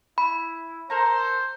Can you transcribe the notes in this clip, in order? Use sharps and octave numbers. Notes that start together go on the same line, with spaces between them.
E4 B5
A4 A#4 C5 A#5